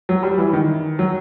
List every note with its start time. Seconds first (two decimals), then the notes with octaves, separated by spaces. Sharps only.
0.09 F#3
0.23 G3
0.38 E3
0.53 D#3
0.99 F#3